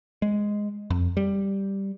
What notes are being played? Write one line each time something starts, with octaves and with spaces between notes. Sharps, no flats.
G#3
F2
G3